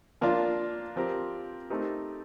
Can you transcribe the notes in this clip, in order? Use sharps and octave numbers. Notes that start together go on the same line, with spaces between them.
F3 A#3 D4 F4
F3 C4 G4 A#4
A3 C4 D#4 G4 A#4